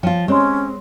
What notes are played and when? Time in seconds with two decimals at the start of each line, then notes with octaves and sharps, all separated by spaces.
0.03 F3 F4 C#5 G5
0.28 G#3 C4 C#4 G4 C#5 C6